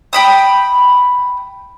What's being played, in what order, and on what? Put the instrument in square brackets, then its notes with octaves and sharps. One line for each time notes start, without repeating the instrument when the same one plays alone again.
[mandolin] G5 B5 D#6